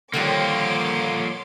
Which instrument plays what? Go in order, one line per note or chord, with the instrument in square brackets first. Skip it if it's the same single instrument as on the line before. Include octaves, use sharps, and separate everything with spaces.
[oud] D3 D#3 G3 [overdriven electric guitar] F3 A#3 [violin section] C#5 C6 D6